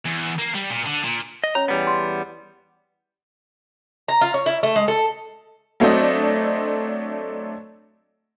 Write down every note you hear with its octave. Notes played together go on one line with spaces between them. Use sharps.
E2
A#3
G3
A#2
D3
A#2
D#5
C#4 C#5 A#5
E2 G3 B3
C6
A#5
F4
C#5
E4
A3
G#3
A4
F#3 A3 C4 D4 D#5